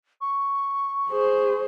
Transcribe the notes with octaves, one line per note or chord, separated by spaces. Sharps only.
C#6
G#4 C5